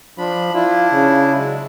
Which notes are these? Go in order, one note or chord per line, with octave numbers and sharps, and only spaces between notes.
F3 D4 B5
D4 E4 F4
C#3
F#3 G#3